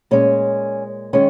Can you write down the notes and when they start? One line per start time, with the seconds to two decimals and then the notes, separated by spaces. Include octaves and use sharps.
0.11 A#2 G#3 C#4
1.13 D#3 G#3 C#4